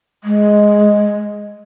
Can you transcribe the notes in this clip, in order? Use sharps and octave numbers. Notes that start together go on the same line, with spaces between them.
G#3